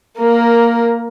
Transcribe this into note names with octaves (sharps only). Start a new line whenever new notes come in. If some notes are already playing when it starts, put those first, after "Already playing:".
A#3 A#4